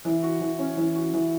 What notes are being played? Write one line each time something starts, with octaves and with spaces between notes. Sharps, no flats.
E3
F#4
E3
C#4
E3
F#4
E3